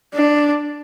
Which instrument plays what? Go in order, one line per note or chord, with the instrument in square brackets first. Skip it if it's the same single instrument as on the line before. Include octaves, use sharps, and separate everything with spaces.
[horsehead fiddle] D4